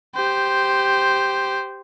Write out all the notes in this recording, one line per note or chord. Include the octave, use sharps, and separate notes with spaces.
G4 C5